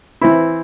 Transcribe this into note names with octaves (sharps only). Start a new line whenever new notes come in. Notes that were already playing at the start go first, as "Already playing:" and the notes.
E3 C4 E4